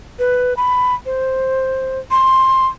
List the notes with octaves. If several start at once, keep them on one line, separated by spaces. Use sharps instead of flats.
B4
B5
C5
C6